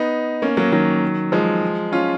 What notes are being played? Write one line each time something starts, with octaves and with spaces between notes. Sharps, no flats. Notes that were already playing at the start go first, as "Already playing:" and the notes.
Already playing: B3 D#4
A#3 C#4
F#3 A#3
D#3 F#3
F3 G#3
C#4 F4